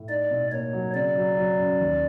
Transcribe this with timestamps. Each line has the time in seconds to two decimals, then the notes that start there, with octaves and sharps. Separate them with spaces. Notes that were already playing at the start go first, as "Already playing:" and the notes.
Already playing: A2
0.08 D#4 D5
0.31 B2
0.52 A#3 C#5
0.73 F#3
0.94 C#3 D5
1.16 F#3
1.37 F#3
1.59 F#2
1.80 D#2